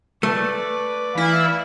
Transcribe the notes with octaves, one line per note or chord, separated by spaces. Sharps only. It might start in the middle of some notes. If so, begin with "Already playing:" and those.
A3 B4 D5
E3 E4 F5